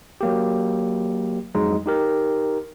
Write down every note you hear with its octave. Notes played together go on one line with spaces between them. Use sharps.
F#3 A#3 G4
F2 F#3 G#3 D#4
D#4 G4 A#4